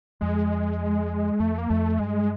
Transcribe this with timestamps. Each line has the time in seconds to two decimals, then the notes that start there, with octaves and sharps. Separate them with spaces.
0.21 F2 G#3
1.40 F2 A3
1.58 A#3
1.70 F2 A3
1.99 G2 G#3